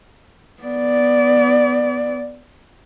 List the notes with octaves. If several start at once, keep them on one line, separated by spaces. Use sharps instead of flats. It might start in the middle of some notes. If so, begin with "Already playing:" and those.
B3 D5